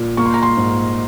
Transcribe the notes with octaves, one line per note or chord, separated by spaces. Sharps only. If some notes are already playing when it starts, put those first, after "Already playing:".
Already playing: A#2
A#3 C#6
C6
A#5
C6
G#2